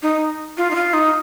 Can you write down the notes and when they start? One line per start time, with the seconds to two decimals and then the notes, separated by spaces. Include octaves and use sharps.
0.03 D#4
0.57 F4
0.71 D#4
0.75 F4
0.93 D#4